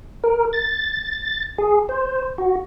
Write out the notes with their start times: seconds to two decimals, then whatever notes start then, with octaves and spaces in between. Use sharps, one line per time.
0.24 A#4
0.53 A6
1.58 G#4
1.89 C5
2.38 F#4